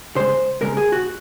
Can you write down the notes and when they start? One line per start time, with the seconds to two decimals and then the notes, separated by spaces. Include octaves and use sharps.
0.16 C#3 G#3 C5
0.61 C#3 G#3 A#4
0.77 G#4
0.92 F#4